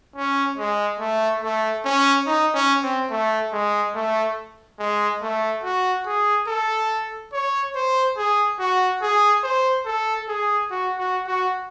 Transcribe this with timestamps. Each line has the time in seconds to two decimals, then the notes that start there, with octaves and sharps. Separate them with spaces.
0.16 C#4
0.58 G#3
1.00 A3
1.42 A3
1.85 C#4
2.26 D#4
2.54 C#4
2.83 C4
3.10 A3
3.52 G#3
3.95 A3
4.79 G#3
5.22 A3
5.63 F#4
6.06 G#4
6.48 A4
7.33 C#5
7.75 C5
8.17 G#4
8.59 F#4
9.02 G#4
9.43 C5
9.85 A4
10.28 G#4
10.70 F#4
10.98 F#4
11.27 F#4